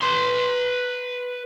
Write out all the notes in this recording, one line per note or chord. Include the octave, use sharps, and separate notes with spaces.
B4 C6